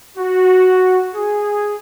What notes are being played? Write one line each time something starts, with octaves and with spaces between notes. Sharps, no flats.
F#4
G#4